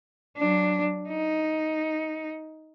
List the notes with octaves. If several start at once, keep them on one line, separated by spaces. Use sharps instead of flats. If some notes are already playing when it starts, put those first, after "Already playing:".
F#3 D4
D#4